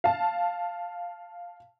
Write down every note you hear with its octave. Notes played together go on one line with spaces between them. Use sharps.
F5 A5